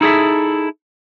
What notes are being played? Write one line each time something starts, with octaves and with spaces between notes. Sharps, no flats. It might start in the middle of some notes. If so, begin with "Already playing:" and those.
D#4 E4 G#4 A4 E5